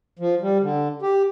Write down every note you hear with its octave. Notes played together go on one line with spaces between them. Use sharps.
F3
G3
D3
G4